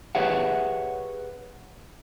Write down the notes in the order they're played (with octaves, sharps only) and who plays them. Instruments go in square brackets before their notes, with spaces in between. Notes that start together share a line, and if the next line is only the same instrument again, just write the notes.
[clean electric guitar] G4 G#4 B4 C#5 E5 F#5